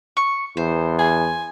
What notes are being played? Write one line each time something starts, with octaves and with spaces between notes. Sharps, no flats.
C#6
E2 C5
G#5